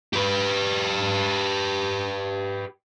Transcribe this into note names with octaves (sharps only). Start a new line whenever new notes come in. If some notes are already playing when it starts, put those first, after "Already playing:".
G4 B4